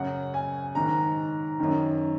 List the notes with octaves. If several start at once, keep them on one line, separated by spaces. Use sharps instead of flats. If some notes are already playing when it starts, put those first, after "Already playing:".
Already playing: F#2 C#3 F#5
G#5
G#2 D#3 A#5
F#2 D#3